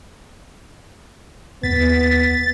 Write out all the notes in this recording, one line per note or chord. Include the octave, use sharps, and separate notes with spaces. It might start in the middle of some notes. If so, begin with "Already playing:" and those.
D#2 B3 A6 B6